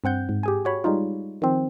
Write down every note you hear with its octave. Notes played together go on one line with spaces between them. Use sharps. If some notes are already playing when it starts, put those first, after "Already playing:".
G2 C4 F#5 G6
G#2
G4 G#4 G#5
F#4 C#5 B5
G3 G#3 D#4 F4
D#3 F3 C4